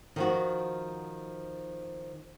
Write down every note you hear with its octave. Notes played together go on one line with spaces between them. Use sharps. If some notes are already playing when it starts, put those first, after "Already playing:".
D#3 F3 F#4